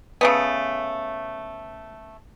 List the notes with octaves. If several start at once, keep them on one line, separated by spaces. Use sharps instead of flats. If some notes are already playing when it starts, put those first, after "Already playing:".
C#3 A3 B3